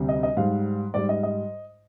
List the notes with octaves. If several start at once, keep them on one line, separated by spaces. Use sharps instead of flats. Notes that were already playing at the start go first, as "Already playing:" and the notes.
Already playing: D2 C3 G3
D#5
D#5
G#2 G3 F5
G#2 G3 D5
D#5
D#5